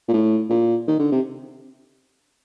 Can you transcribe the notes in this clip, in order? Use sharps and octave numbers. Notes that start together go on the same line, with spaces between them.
A#2
A2
A#2
D#3
D3
C3